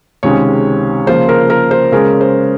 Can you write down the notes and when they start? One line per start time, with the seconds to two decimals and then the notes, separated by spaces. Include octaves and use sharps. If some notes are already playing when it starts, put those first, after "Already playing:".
0.23 C#2 C3 D#3 G#3 C#4 C#5
1.07 C#3 F3 A#3 F4 C5
1.29 A#4
1.50 A#4
1.71 C5
1.92 C#3 G#3 C#4 A#4
2.21 C5